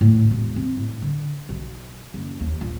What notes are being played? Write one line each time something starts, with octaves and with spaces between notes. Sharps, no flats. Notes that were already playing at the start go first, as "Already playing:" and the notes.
A2
E1
C4
A2
D3
B1
F#1
D#2
A#1